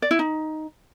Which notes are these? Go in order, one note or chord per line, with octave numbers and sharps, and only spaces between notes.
D5
E4
D#4